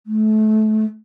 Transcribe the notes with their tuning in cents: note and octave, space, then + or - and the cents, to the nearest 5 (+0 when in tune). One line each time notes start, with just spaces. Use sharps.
A3 -25